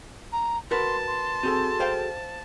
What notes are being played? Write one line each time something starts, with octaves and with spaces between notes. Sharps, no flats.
A#5
F#4 A#4 B4 A5 C6
C6
C4 F#4 G#4 A4
C5 F5 G5